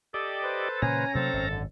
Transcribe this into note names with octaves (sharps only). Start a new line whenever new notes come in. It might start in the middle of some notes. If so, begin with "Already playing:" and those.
G4 A4 D5 D#5
B4 C5
A#2 C#3 E3 C#4 G#5 A#5 A#6
C3 F#3 A#3 C4 A4 C5
G#1 F#2
D3